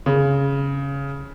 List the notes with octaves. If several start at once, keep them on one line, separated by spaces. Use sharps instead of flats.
C#3